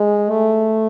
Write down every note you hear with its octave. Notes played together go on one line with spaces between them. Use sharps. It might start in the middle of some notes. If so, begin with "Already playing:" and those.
Already playing: G#3
A3